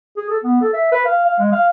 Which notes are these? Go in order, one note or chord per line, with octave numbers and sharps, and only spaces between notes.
G#4
A4
B3
A4
E5
B4
F5
F5
G#3
F5